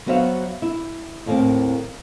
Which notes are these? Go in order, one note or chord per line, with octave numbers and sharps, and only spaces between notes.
F#3 B3 F#4 C5 E5 F5
E4
D#2 A2 A#3 C4